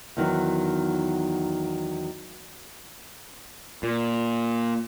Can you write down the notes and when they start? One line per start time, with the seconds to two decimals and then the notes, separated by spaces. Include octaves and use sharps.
0.17 E2 D#3 F#3
3.83 A#2